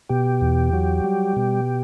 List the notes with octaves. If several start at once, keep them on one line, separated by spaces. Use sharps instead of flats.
B2 G4
E2
F#3
G3
B2